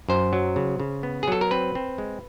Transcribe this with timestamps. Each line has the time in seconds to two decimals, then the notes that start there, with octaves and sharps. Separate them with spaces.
0.09 F#2 C5
0.33 F#3
0.56 C#3
0.80 C#3
1.03 B3
1.23 G#4
1.28 F#3 A4
1.41 A#4
1.51 C4 B4
1.75 C4
1.98 G#3